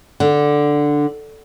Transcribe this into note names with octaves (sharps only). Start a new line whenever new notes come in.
D3